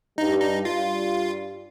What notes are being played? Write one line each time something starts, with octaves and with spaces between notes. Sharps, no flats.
G2 G3 D#4
D#4
G2 G3 F4